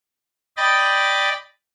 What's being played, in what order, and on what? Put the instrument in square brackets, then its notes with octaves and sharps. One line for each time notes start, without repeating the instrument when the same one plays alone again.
[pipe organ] D5 D#5 G5 B5 A6